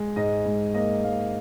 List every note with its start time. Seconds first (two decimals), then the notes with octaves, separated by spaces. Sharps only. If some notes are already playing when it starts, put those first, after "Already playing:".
Already playing: G#3
0.16 G#2 D#5
0.45 G#2
0.74 A#3 D#5
1.04 G#2 F5